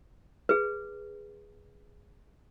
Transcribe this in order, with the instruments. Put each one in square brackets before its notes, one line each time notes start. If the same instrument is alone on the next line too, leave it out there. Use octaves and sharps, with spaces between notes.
[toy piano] G#4 B4